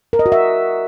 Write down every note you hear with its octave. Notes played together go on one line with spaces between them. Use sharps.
A#4
D#5
F#4
E5